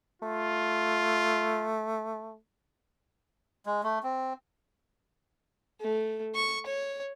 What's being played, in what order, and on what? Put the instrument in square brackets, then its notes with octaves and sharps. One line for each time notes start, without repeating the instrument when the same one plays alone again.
[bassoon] A3 [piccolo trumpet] F4
[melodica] G#3
A3
C4
[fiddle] A3
C#6
C#5